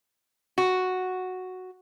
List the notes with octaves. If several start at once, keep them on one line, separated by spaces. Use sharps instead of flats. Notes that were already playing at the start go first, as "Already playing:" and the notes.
F#4